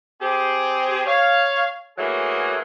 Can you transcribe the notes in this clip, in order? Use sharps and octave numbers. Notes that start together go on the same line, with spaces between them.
C4 G4 G#4
C#5 F5
E3 F#3 A3 A#3 G#4